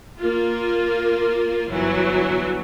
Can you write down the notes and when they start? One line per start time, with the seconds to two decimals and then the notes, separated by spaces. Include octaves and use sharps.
0.18 A#3 F4
1.70 G1 E3 F#3